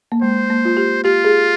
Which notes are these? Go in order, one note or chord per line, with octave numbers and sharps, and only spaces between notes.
A#3
G#3 C5
A#3
F4
G4
F4 G4
G#4